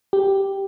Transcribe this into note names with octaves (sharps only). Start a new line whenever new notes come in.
G4